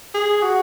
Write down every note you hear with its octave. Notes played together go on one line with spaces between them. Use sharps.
G#4
F#4